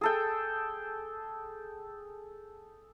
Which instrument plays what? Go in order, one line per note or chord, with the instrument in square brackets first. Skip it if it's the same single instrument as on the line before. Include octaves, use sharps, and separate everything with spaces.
[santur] G#4 A4 G5